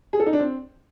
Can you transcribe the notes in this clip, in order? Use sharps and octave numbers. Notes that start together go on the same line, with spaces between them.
G#4
A4
D#4
D4
C4